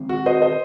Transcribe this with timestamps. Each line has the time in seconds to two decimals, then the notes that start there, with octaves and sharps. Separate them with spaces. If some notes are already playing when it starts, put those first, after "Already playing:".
Already playing: D#3 G#3 C4
0.09 F#4
0.26 C5 D#5
0.42 C5 D#5